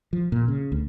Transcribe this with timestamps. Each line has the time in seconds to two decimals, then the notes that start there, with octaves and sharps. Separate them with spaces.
0.13 F3
0.32 A#2
0.48 C#3
0.72 D2